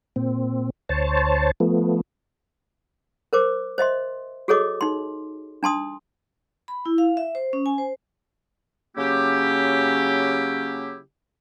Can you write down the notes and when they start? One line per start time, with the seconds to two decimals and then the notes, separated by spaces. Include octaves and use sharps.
0.16 A#2 C4
0.89 D2 C5 C#5 A5
1.60 F3 A3 B3
3.33 A#4 C5 D6
3.78 C5 D#5 E5 C6
4.48 F#4 G#4 A4 C#5 D#5 D6
4.81 D#4 C6
5.63 D4 A5 C6 D#6
6.68 B5
6.86 E4
6.98 F5
7.17 E5
7.35 C5
7.53 C#4
7.66 G#5
7.78 C5
8.97 C#3 F#3 A#3 C#4 E4 G4